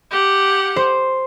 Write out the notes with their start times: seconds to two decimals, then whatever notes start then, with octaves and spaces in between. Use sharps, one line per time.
0.11 G4 F#5
0.76 C5